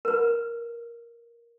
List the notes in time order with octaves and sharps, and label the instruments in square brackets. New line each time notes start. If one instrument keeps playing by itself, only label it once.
[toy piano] A#4 B4